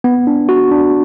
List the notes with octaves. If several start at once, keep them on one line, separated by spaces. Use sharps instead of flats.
B3
D4
F#4
D4